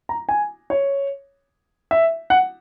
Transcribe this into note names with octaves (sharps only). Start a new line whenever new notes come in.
A#5
G#5
C#5
E5
F#5